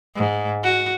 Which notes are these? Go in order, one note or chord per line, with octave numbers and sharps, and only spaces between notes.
G#2
F#4